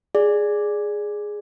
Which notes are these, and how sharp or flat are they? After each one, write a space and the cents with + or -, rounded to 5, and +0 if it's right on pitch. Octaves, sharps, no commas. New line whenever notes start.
G#4 +0 D5 +0